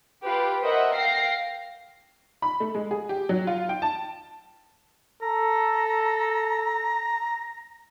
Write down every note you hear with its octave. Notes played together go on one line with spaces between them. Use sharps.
F4 G4 B4
A#4 C5 D#5 E5 F#5
F5 G5 A#6 C7
B5
A3
G#3
G#4
G4
F#3
F4
G5
A5
A4 A#5